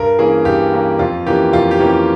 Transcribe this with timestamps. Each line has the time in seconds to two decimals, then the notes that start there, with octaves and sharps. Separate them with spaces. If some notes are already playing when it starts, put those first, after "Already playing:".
Already playing: G2 A#4
0.19 E3 A#3 C#4 G#4
0.45 G2 G4
0.73 E3 A#3 C#4
0.99 F2 F4
1.26 E3 A#3 C#4 G4
1.53 F2 F4
1.71 G4
1.80 E3 A#3 C#4
1.89 G4